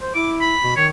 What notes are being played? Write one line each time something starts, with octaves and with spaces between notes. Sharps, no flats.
C5
E4 D6
B5
B2
D#3 C#5